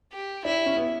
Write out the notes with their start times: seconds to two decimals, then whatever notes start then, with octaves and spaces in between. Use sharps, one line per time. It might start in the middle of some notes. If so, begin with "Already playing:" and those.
0.12 G4
0.45 D4 E4
0.66 C#4
0.76 B3